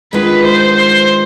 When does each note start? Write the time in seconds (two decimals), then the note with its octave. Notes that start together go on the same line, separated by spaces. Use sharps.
0.13 D#3 G#3 B3 D4 F4 B4
0.44 C5
0.76 C5